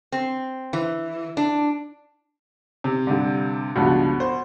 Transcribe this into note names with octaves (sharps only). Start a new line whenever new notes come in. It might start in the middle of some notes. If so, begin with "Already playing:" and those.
C4
E3
D4
C3
G2 D3
C#2 G2 B2 F3
C5